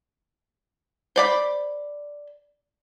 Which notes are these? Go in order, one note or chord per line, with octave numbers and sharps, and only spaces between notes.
C5 D5 B5